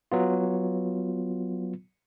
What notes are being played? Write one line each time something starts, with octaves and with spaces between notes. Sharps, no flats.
F#3 B3 F4